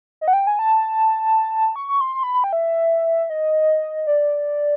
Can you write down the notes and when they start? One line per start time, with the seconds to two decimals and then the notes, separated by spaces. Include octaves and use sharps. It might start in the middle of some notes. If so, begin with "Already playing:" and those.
0.21 D#5
0.28 F#5
0.33 G5
0.47 G#5
0.59 A5
1.76 C#6
1.89 C#6
2.01 C6
2.15 C6
2.23 B5
2.34 B5
2.44 G5
2.53 E5
3.30 D#5
4.07 D5